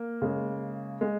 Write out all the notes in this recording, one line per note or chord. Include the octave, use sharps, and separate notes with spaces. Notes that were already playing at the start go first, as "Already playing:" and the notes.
Already playing: A#3
C#3 G#3
G#3